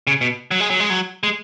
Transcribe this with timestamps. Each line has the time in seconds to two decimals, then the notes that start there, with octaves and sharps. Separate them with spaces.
0.07 C#3
0.21 B2
0.51 F#3
0.60 G#3
0.70 F#3
0.80 G#3
0.90 F#3
1.23 G#3